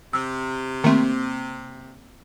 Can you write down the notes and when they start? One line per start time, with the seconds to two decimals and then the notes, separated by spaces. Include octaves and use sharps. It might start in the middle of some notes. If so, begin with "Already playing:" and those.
0.13 C3 E6
0.84 D#3 A3 A#3 C4